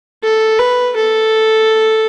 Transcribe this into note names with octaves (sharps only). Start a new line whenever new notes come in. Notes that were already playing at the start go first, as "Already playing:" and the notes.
A4
B4
A4